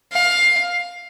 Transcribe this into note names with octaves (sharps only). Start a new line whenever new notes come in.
F5